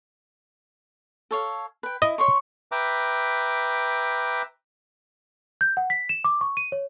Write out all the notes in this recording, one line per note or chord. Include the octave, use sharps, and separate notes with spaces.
A4 C#5 F5
B4 G5
E4 D#5
C#5 C6 C#6
B4 E5 G5 A#5 D6
G6
F#5
B6
E7
D6
C#6
D#7
C#5